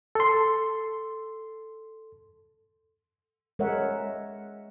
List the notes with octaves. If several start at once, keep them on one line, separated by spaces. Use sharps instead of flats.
A4 C6
G#3 A#4 C#5 E5 F#5